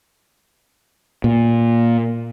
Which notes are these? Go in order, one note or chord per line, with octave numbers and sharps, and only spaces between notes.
A#2